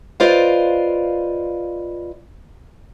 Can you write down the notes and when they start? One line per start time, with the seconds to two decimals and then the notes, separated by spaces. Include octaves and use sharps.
0.20 F4 B4 C5 D5 D#5 F5